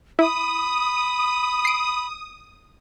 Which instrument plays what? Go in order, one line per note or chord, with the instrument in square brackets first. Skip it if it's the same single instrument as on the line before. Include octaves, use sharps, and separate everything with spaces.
[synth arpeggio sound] E4 [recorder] B5 [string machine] D#6
[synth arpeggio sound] C7 D7